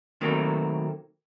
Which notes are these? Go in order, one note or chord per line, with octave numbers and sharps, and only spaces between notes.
B2 D#3 F#3 A3 A#3 C4